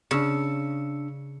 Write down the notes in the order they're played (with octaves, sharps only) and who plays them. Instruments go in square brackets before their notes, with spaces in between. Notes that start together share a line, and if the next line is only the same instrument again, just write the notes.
[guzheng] C#3 [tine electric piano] D4 E6 C#7